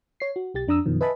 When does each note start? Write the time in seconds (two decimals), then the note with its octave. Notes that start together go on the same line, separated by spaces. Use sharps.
0.20 C#5 C7
0.36 F#4
0.54 B1 G4 A6
0.67 F2 D4 A#5 D#6 E6
0.86 F#2 B2 D#3 F3
1.01 B4 D#5 E5 G#5 A5 B5